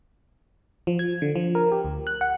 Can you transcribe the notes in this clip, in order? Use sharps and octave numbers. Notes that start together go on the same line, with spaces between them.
F3
G#6
D3
F3
A#4
G4
D2
F#6
F#5